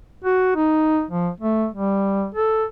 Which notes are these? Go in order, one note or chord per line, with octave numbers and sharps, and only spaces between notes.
F#4
D#4
F3
A3
G3
A4